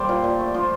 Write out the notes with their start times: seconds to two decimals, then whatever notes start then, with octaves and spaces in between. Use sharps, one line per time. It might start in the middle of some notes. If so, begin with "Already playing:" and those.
Already playing: G3 A#3 C5 D5
0.09 A#2
0.24 A#2
0.39 A3
0.54 F3